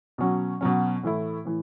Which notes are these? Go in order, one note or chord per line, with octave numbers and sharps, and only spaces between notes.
B2 F#3 C#4
B2 F#3 C#4
A2 E3 A3 E4
A2 E3